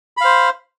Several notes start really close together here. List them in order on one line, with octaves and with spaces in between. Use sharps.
B5 F5 C5